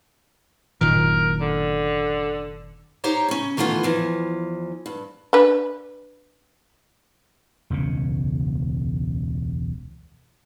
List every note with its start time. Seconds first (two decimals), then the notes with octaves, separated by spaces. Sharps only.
0.81 F#1 A#2 D#3 A#4
1.41 D3
3.04 D#4 G4 C5 C#5 A#5
3.28 C#3 C#4
3.57 D#3 E3 A3 B3 F4
3.83 E2 E3 F3
4.86 G2
5.33 D4 B4
7.70 E1 C#2 F#2 C#3